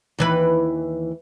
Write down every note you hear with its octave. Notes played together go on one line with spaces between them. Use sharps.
D#2 E3 B4